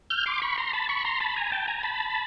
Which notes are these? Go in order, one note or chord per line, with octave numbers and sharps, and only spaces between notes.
F6 G6
C6 D6
B5 C#6
A#5 C6
A5 B5
B5 C#6
A#5 C6
A5 B5
G#5 A#5
G5 A5
G#5 A#5
A5 B5